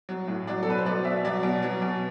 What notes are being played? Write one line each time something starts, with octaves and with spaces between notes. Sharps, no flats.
F#3
A2
F#3 D5
A4
B2 B4
C5
F#3 D5
B2 E5
F#3 D5
B2
F#3
B2